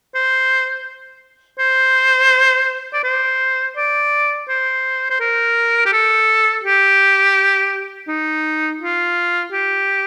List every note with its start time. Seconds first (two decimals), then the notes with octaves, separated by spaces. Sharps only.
0.15 C5
1.59 C5
2.93 D5
3.03 C5
3.76 D5
4.48 C5
5.10 C5
5.20 A#4
5.85 G4
5.93 A4
6.64 G4
8.08 D#4
8.81 F4
9.52 G4